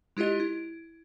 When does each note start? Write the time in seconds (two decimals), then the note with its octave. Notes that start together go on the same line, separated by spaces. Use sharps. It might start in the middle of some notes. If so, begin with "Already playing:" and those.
0.17 G#3 E4 F4 G4 D#5
0.40 E4